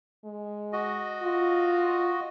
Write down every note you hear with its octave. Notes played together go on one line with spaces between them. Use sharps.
G#3
F#4 D#5
F4